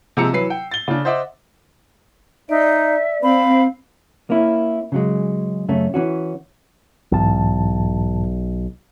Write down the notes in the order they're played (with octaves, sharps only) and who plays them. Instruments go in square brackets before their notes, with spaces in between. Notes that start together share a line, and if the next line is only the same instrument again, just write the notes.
[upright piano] C3 F3 G#3 A#5 E6 C#7
E3 F#3 B4 C7
G5
A6 G7
C#3 D4
C5 D#5 E5 F#5 D6
[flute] D#4 [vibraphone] D5 [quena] E5
[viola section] C4 [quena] F5 [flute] B5
[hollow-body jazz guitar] A#3 C#4 E4
C#3 F#3 G#3
F#2 C#3 A3 C#4
E3 C#4 F#4
[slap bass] B1 [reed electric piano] G#2 E3 A5